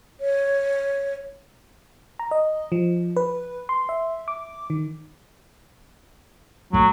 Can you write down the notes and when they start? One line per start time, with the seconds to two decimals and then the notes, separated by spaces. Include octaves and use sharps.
0.20 C#5
2.19 A#5
2.31 D#5
2.72 F3
3.16 B4
3.69 C6
3.89 E5
4.28 D6
4.70 D#3
6.73 A#1 F#3 A3